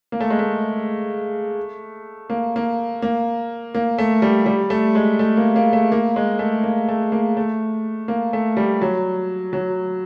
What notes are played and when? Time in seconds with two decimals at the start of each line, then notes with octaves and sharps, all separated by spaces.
0.12 A#3
0.20 A3
0.30 G#3
0.39 A3
2.30 A#3
2.56 A#3
3.02 A#3
3.74 A#3
3.98 A3
4.22 G3
4.46 G3
4.70 A3
4.95 G#3
5.19 A3
5.37 A#3
5.56 A#3
5.73 A3
5.92 A#3
6.16 G#3
6.39 A3
6.63 A#3
6.88 A3
7.12 A#3
7.37 A3
8.08 A#3
8.33 A3
8.57 G3
8.82 F#3
9.53 F#3